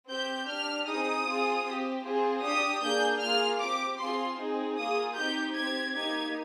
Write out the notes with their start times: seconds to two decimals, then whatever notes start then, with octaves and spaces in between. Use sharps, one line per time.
0.10 C4 G4 G6
0.49 D4 G4 F6
0.88 C4 D#4 G#4 D#6
1.26 C4 F4 G#4
1.66 C4 G4
2.05 C4 F4 G#4
2.43 D4 G4 D#6
2.83 A#3 D4 G#4 G6
3.22 A#3 F4 G#4 F6
3.61 C4 G4 D6
4.00 C4 F4 G#4 C6
4.38 C4 D#4 G#4
4.77 A#3 F4 G#4 D#6
5.17 C4 D#4 G4 G6
5.55 C4 G4 G#6
5.94 A#3 D#4 G4 G#6